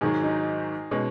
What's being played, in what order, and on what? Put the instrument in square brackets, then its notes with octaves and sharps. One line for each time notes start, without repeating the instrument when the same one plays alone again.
[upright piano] G#2 D#3 F#3 [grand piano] G#4
[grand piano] D#4
[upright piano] B2 G#3 C#4